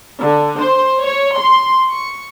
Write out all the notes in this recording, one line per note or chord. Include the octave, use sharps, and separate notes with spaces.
D3
C5
C#5
C6
C#6